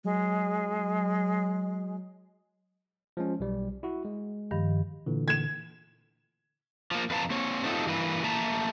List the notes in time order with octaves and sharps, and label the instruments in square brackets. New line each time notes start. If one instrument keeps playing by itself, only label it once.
[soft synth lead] F#3 [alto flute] G#3
[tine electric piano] F3 G#3 C#4
B1 G3
E4 F#4
G#3
[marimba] G2 D#3 F3
[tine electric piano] A#2 D3 E3
[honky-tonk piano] G#6 E7
[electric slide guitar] F3 A#3
F2 B4 F5 A5 A#5
A#3 C4 C#5
A3 C4 D#4 F4 A4
G2 E3 A#3 B4
A3 A#3 E5 A5 A#5